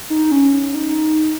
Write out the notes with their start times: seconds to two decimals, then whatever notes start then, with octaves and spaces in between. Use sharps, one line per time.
0.10 D#4
0.31 C#4
0.75 D#4